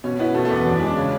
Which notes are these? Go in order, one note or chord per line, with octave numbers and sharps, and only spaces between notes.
B2 C#4
B3 E4
B2 A3
A3
E2
B3
F#2 D4
E4
G#3
D4
C#3 C#4